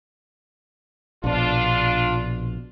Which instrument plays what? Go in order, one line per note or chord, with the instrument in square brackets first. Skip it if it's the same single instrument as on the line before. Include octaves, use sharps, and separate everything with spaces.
[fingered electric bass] A#1 B2 [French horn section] D4 F4